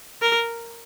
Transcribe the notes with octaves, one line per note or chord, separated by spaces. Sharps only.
A#4